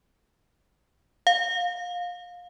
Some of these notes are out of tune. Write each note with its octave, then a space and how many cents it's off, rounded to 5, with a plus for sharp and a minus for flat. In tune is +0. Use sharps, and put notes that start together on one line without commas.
F5 +20